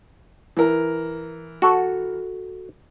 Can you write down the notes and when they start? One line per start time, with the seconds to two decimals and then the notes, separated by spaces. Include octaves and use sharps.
0.57 E3 A#4
1.62 F#4 A4